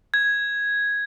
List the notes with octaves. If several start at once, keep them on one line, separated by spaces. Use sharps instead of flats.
G#6